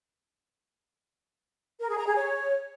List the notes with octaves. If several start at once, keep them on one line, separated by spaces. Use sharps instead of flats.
A#4
G#4
A#5
G#4
C#5